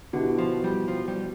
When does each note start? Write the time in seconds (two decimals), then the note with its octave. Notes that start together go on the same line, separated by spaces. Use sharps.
0.13 B2 D3 B3 E4 G4
0.38 F3
0.64 G3
0.88 F3
1.08 G3